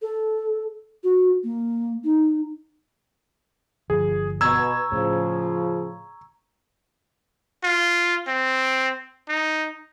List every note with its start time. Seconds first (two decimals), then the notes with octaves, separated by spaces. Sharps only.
0.02 A4
1.04 F#4
1.44 A#3
2.04 D#4
3.90 G1 F3 G#4
4.41 B2 A#5 C#6 E6 G#6
4.92 A2 C#3 F3
7.64 F4
8.28 C4
9.28 D#4